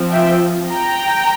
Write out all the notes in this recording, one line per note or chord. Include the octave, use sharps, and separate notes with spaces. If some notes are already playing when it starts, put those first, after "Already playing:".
Already playing: F3 C4
E5 G5
G5 A#5